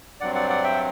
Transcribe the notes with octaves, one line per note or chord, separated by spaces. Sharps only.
G2 F#3 C4 D5 F#5
D5 F#5
D5 F#5
E5 G5